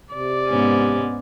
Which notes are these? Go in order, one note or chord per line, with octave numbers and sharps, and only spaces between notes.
C3 D5
G#2 B3 C#4